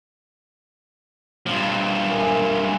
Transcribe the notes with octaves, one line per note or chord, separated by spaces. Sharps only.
G2 F3
A#4 E5 G#5